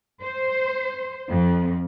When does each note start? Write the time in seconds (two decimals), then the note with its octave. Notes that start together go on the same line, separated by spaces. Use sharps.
0.22 C5
1.29 F2